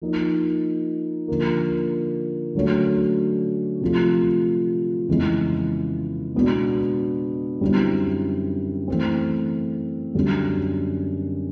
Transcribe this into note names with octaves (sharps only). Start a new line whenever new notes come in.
F3 A#3 D#4
D3 F3 A#3
D3 F#3 A3 C#4 F#4
C3 F3 A3
F2 C#3 E3 G#3 B3
B2 G#3 B3 D4 F#4
F#2 D3 G3 C4 E4
E3 A3 C4
F#2 D3 G3 B3